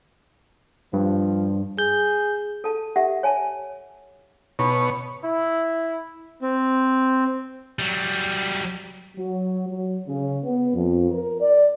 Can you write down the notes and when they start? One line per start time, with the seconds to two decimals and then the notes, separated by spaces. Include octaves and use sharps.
0.93 G2 F3
1.79 G#4 G6
2.64 A4 A5
2.96 G4 E5 F#5
3.23 C#5 G#5 A5
4.59 B2 E4 C#5 B5
5.24 E4
6.42 C4
7.79 F#3 G3
9.17 F#3
9.67 F#3
10.07 C#3
10.44 B3
10.75 F2
11.11 A#4
11.40 D5